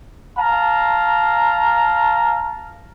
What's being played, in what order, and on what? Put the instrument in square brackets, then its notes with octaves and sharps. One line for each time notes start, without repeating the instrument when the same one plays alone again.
[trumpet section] F5 A5 A#5